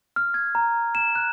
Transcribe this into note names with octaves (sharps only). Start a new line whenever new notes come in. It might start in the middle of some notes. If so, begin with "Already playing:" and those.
F6
G#6
A#5
E7
F#6